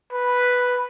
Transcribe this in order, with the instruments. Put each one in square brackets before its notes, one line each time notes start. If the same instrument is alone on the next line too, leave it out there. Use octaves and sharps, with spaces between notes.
[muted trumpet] B4